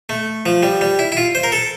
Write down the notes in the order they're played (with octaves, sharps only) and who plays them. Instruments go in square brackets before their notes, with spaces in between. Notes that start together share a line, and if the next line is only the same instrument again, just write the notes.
[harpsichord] A3
F3
G3
G3
E4
E4
F4
C5
A#4
A4